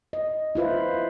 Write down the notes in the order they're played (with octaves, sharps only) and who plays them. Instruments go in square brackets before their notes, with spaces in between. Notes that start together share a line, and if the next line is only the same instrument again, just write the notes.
[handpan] D#5
E4 F4 B4 C5